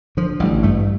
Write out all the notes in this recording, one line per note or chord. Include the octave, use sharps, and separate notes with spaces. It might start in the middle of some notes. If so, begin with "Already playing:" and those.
D3 F3
A1 G3
G2 A3